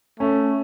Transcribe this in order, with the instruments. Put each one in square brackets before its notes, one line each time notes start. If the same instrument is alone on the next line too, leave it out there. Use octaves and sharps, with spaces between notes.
[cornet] A3 [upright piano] C#4